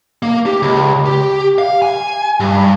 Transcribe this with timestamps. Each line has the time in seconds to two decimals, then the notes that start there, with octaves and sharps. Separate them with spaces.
0.23 A#3
0.46 G4
0.62 C#2
1.06 G4
1.58 F5
1.82 G#5
2.40 G2